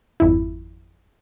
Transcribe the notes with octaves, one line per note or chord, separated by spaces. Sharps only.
G#1 F2 E4